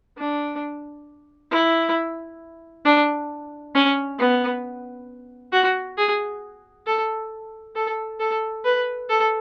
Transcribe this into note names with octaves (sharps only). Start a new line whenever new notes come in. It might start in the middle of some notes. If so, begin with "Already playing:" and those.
D4
E4
D4
C#4
B3
F#4
G#4
A4
A4
A4
B4
A4